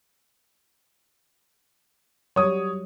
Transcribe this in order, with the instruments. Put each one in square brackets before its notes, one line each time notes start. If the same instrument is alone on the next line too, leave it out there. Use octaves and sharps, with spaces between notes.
[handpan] F#3 G3 [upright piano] C#5 D#6